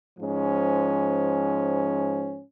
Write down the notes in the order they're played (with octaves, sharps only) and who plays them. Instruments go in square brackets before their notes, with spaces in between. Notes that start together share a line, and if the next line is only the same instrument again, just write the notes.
[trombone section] G#2 F3 C#4